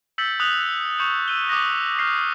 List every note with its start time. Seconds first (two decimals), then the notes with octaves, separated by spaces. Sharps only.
0.18 E6 G6 A6 B6 C#7 F#7
0.40 D#6 F#6 B6 F7 F#7
0.99 C#6 G6 C#7 F7 F#7
1.28 E6 D#7 G7
1.49 D6 D#6 F#6 A#6
1.99 F6 G6 A#6 C7